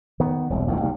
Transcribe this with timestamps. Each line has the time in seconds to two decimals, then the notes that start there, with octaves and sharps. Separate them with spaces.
0.20 D#3 B3
0.50 E1 C2
0.68 A1 G#2 B2 D#3
0.81 D#2 C3 F3 G3